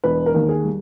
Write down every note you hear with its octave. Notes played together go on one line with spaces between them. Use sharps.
E1 B4
A#4
D#2
G#4
G3